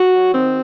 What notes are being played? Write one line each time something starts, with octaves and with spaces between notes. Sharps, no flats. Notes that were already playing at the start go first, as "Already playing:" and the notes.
Already playing: F#4
F#3
D#3 C4